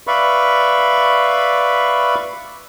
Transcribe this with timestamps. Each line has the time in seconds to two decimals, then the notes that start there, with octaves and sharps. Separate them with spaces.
0.07 B4 D5 E5 F5 B5 C#6